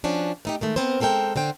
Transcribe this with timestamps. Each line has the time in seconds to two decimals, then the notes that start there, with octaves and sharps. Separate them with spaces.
0.04 F3 C#4 D4 F#4
0.45 A3 D#4 G4
0.61 D#3 G#3 A3
0.76 B3 C4 A#4 C5
1.00 G#3 C4 A4 A#4 G5
1.36 D3 C5 G5